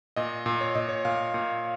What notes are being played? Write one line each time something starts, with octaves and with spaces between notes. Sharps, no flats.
A#2 D#5
A#2
C#5
A#2 D#5
C#5
A#2 F5
A#2